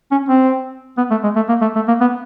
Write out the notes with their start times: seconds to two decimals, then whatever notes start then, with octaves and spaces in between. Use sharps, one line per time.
0.11 C#4
0.29 C4
0.97 B3
1.11 A3
1.24 G#3
1.36 A3
1.49 A#3
1.62 A3
1.76 A3
1.88 A#3
2.01 B3